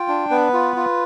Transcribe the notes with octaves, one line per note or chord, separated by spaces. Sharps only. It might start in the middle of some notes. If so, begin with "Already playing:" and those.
Already playing: F4 G5
D4
B3 B4
F4
F4